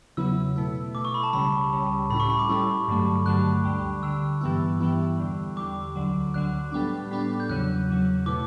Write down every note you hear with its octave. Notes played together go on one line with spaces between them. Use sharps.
E2 C#3 F#3 B3 E4 E6
B2 A3 E4
B2 A3 E4 D6
C#6
B5
A5
C#2 C#3 G3 B5
C#2 C#3 G3
A2 G3 C#4 E4 B5
C#6
B5
D6
A2 G3 C#4 E4
G2 D3 F#3 A3
G2 D3 F#3 A3 F#6
D2 D3 G3
D2 D3 G3 E6
G2 E3 G3 B3 E4
G2 E3 G3 B3 E4
E2 D3 G3
E2 D3 G3 D6
D2 D3 F#3
D2 D3 F#3 F#6
A2 G3 B3 D4
A2 G3 B3 D4
G6
E2 C#3 F#3 F#6
E2 C#3 F#3
B2 A3 E4 D6